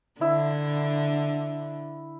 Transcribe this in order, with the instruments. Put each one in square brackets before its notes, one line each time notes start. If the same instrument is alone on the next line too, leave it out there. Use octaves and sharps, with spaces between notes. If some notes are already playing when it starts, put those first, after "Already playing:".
[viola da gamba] D3 [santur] E4